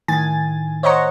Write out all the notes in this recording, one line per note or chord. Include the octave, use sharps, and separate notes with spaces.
A2 D#3 G#5 A6
C5 C#5 D#5 F#5 A#5 C#6